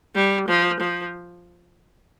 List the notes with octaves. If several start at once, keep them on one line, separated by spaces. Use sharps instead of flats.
G3
F3
F3